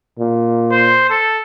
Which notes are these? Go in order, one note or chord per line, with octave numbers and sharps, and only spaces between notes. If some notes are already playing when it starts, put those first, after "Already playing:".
A#2
C5
A4